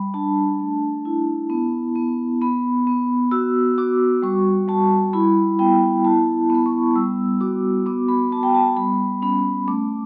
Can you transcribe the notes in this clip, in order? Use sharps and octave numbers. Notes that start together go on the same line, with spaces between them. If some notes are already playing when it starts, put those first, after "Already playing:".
Already playing: G3 B5
D4 A5
A3
E4
B3
B3
B3 B5
B3
F#4 E6
F#4 D6
G3 C#6
G3 A5
E4 B5
B3 G5
E4 A5
B3 B5
C#6
G3 E6
F#4 D6
B3 D6
B5
B3 A5
G5
A5
G3 B5
C#4 B5
A3 D6